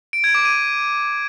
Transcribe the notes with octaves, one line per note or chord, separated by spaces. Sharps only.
D7
G#6
D6
D#7